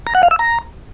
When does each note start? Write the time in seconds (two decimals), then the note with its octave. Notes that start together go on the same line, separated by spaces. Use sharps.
0.07 A#5
0.15 F#5
0.23 F5
0.31 E6
0.39 A#5